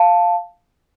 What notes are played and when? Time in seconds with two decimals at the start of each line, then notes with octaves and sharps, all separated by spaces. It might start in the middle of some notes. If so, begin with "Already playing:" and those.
Already playing: F5 A5